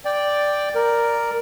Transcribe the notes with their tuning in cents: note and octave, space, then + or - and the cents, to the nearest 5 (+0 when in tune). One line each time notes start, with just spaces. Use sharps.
D5 +0 G5 +0
A#4 +0 D5 +0